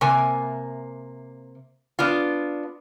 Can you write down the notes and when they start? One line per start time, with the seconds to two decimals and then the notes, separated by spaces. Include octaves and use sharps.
0.01 C3 A#3 G#5
1.99 B3 D4 F4